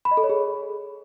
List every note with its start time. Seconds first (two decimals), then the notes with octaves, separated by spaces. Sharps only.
0.05 B5
0.11 D#5
0.17 A4
0.23 C#5
0.29 G#4